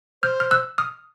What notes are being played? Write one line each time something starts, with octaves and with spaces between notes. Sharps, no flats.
C5 F6 G6
F6
E6 F#6
D#6 F6